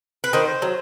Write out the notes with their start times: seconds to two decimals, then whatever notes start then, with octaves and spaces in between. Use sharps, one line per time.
0.24 B4
0.33 D#3 C5
0.62 F#3